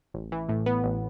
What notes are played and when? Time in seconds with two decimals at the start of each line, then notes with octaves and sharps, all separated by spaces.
0.14 A1
0.32 E3
0.49 A2
0.66 B3
0.84 A1